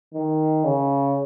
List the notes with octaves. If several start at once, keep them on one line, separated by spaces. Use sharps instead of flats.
D#3
C#3